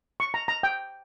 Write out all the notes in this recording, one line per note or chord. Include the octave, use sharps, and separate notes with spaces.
C#6
A#5
A#5
G5